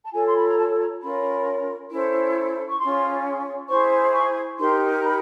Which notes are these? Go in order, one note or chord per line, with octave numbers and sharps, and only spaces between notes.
A5
F4 A4 C#5 G#5
C6
B5
A#5
A5
A#5
C#4 F4 A#4 C#5 B5
C#4 E4 A4 C5
C#6
C#4 F4 G#4 C6
E4 G#4 C5 C#6
C#6
D#4 G4 A#4 C6
B5